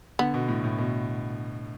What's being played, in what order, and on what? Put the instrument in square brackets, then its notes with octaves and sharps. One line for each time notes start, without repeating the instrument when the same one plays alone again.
[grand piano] D3 [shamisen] B3
[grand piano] B2
A2
A2
B2